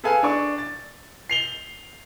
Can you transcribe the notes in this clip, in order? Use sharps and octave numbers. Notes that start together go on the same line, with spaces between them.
G#4 A4 B4 F5 G#5
D4 C#6
A6
C7 F7 G7